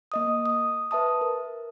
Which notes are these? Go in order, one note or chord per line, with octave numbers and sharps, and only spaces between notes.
A#3 D#5 D#6
D#6
B4 E5 A5 D#6
A#4